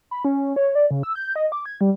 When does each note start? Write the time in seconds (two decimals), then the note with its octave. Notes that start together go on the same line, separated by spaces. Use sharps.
0.11 B5
0.25 C#4
0.56 C#5
0.75 D5
0.91 C#3
1.03 E6
1.15 G6
1.36 D#5
1.52 D6
1.66 G#6
1.81 G3